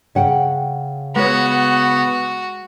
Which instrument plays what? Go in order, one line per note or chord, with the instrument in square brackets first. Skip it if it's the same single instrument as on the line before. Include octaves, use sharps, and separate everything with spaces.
[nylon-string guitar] C#3 F#5 G5
[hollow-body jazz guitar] G#3 C#5 [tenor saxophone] B3 [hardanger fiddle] F#4